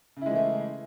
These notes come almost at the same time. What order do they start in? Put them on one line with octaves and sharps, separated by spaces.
C#3 E4 G#3 E3 A3